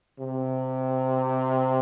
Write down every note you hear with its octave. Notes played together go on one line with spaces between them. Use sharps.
C3